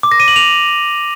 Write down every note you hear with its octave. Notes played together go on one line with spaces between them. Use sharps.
D6
A#6
D#7
F#7
F7